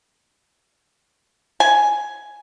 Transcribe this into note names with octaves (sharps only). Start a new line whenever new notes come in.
G#5